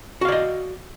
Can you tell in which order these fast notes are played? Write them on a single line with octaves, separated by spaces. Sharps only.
F#4 F5 D5 D#5